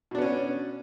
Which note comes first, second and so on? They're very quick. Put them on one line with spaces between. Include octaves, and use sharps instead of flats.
B2 D4 B3 C#4